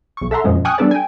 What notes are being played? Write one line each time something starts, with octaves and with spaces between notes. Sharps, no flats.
B1 C#6
A4 E5 F#5 A#5 C6
F2 A#2 C#3 F3 G#3 C#4
G5 G#5 C#6 D#6 F6 F#6
G3 B3 D4 A4 B4 D5
G5 G#5